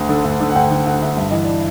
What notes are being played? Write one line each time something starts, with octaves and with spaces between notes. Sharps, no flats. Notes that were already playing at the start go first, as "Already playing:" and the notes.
Already playing: D2
D3
D2
D3
F#5
D2 G5
D3
D2 F#5
D3 E5
G2 E5
E3 D#5
D5